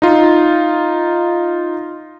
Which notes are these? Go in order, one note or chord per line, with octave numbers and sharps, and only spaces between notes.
D#4 F4